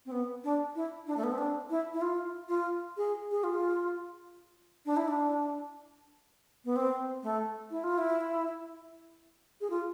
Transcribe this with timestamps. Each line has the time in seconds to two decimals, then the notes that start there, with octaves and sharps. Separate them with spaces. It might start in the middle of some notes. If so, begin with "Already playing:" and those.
0.06 C4
0.11 B3
0.44 D4
0.75 E4
1.07 D4
1.17 A3
1.23 B3
1.32 C4
1.38 D4
1.70 E4
1.93 E4
2.01 F4
2.48 F4
2.97 G#4
3.31 G#4
3.44 F4
4.86 D4
4.97 E4
5.08 D4
6.65 B3
6.76 C4
7.23 A3
7.71 E4
7.83 F4
7.98 E4
9.61 G#4
9.70 F4